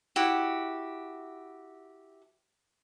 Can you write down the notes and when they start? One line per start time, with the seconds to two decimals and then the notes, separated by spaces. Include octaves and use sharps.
0.16 E4 F#4 G4